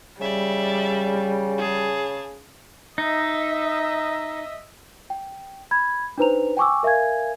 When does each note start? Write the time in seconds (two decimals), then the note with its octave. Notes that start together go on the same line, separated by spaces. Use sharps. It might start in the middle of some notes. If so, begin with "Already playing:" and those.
0.21 C#3 G3 D5 E5
1.58 G#4 A5
2.98 D#4 D#5 E5
5.10 G5
5.71 B5 G#6
6.18 D4 D#4 B4 C5 A#5 F7
6.57 G5 G#5 C#6 D6 E6
6.83 A#4 E5 F5 G#5 G#6